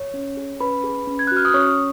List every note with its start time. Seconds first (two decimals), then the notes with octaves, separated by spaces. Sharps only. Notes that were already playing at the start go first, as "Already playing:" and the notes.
Already playing: C#5
0.14 C#4
0.37 G#4
0.60 C#4 B4 B5
0.84 G#4
1.07 C#4
1.19 G#6
1.27 F#6
1.31 F#4
1.37 F6
1.45 D#6
1.54 C#4 C#5 C#6